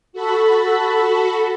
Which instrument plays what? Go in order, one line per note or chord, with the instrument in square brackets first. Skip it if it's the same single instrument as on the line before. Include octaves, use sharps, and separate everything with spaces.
[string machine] F#4 A4 B5